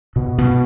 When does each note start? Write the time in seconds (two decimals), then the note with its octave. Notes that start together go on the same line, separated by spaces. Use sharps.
0.16 B2
0.38 B2